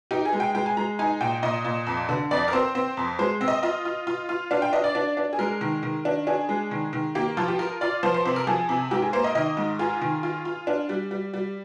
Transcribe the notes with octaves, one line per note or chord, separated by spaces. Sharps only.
D#4 G4
G#4
G#3
G5
G#3 G5
G#5
G#3 A#5
D#4 G#5
A#2 G5
A#2 D#5
A#2
F2
D3
F2 D5
A#4
C4 C5
C4 C5
F2
G#3 C5
C4
D#5
F4 D#5
F4
F4
F4
D4 F5
G5
D4 D#5
D5
D4
D4
G#4
G#3 A#4
D#3
D#3
D4
D4 G#4
G#3
D#3
D#3
A#3 G4
F3 F4
G4
F4 A#4
F4 D5
F3 C5
C5
C3 C5
A#4
F3 G#4
C3
G#2 G4
G#4
A#3 C5
D#5
D#3 D#5
G#2
F4 G#4
D#3
F4
F4
D4
G3
G3
G3